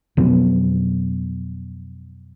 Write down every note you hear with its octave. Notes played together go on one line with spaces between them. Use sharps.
F2 B2 F#3 B3